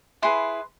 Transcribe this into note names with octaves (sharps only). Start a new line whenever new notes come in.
E4 G#4 B4 C6